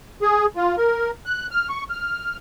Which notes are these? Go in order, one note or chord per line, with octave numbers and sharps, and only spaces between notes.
G#4
F4
A#4
F#6
F6
C#6
F6